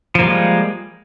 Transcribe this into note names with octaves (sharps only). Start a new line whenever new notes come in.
F3 G3 G#3 A#3